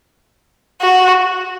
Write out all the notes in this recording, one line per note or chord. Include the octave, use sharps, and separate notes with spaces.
F#4